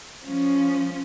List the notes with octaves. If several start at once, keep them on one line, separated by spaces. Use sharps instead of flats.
F3 C#4